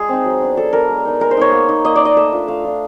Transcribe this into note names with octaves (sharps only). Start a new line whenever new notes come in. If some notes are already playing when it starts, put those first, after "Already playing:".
Already playing: G#3 G#4
C4 D#4
F#3
B3 D4
F#3 A4
B3 D4 A#4
G#3
B3 D#4
G#3 A#4
C5
B3 D#4 C#5
A#3
D#4
A#3 D#5
D#4 D5
D#5
A3 E5
D4 F4
A3 F5
D4 F4